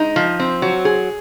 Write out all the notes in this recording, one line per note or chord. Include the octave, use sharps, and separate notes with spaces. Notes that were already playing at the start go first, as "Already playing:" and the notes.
Already playing: G#3 D#4
F3
C4
F#3
G#4